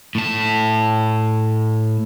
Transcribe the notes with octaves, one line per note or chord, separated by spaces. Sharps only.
A2 A5